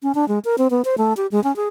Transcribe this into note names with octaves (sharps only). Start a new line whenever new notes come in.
C#4
D4
G#3
A#4
C4
B3
C5
A3
G4
G#3
C#4
G#4